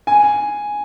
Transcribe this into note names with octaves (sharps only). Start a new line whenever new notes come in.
G#5